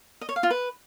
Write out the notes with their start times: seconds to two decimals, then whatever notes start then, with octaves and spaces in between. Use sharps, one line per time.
0.21 D#5
0.29 C#5
0.36 F5
0.43 F4
0.50 B4